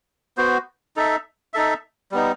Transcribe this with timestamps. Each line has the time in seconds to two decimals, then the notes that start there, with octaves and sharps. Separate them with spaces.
0.37 B3 F#4 C5
0.96 D#4 A4 E5
1.54 D#4 A4 E5
2.12 G3 B3 D#4